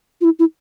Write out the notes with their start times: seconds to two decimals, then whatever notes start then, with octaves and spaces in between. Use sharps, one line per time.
0.21 F4
0.24 E4
0.39 E4